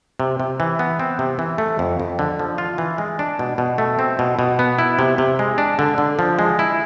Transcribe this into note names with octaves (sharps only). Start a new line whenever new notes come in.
C3
C3
E3
B3
C4
C3
E3
A3
F2
F2
D3
F3
F4
E3
G#3
D4
B2
B2
A3
C4
B2
B2
B3
E4
C3
C3
G#3
D4
D3
D3
F3
G#3
E4